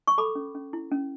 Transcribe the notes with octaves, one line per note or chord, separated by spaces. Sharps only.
C#6
A4 B5 D6
C#4
C#4
E4
C#4